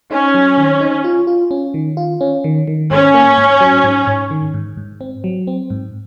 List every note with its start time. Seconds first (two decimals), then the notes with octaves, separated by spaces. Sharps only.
0.11 C#4 D#4
0.34 F#3
0.58 D#3
0.80 D#4
1.04 F4
1.27 F4
1.51 C#4
1.74 D#3
1.97 F4
2.21 C#4
2.44 D#3
2.67 D#3
2.91 G#2 C#4
3.14 A#3
3.38 G#2
3.61 F#3
3.84 G#2
4.07 G#2
4.31 D#3
4.54 G#2
4.77 G#2
5.01 C4
5.24 F#3
5.47 C4
5.70 G#2